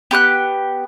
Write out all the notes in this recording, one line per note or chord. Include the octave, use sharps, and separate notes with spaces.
B3 G4 C#6 F#6